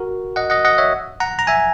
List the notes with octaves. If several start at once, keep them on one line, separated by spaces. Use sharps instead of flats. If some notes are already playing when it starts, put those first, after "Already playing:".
Already playing: F#4 A#4
D#5 F#5
D#5 F#5
D#5 F#5
C#5 E5
F#5 A#5
A#5
E5 G#5